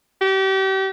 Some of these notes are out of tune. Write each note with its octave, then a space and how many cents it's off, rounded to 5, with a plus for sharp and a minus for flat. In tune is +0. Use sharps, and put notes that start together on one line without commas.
G4 -35